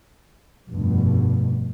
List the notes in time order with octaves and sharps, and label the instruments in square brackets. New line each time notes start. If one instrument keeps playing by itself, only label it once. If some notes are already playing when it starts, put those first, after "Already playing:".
[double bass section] F1 G2 B2